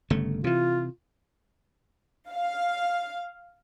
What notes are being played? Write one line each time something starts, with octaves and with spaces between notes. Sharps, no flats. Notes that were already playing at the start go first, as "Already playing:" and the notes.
G1 C#3 A3
C3 E3 F4
F5